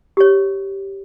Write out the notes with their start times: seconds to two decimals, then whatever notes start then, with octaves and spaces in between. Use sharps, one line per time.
0.17 G4 C#5